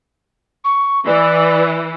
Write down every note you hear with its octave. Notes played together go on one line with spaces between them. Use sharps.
C#6
E3 D5